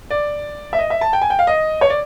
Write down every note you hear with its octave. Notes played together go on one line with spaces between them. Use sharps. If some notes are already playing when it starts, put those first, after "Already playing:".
D5
E5
D#5
E5
A5
G5
G#5
G5
F5
D#5
C#5
D5